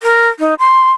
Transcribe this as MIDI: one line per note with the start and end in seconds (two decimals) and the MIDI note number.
0.03 0.29 70
0.39 0.54 63
0.59 0.91 84